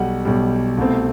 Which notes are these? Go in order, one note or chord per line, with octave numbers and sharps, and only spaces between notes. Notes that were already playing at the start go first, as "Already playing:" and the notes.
Already playing: B1 B2 G3 F#5
B1 B2 G3
C2 B2 A3 C4